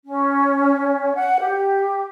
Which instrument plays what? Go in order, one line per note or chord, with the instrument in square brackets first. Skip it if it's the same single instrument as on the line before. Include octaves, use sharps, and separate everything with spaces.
[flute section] C#4
F#5
G4